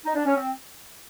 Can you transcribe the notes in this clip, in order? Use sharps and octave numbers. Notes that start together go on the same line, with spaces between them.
D#4
D4
C#4
C4